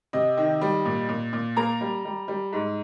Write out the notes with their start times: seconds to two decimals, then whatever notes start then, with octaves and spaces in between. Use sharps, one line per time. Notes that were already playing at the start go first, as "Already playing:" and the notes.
0.13 C3 D#5
0.37 D#3
0.61 G3
0.85 A#2
1.09 A#2
1.33 A#2
1.57 A#3 A#5
1.81 G3
2.05 G3
2.28 G3
2.53 G#2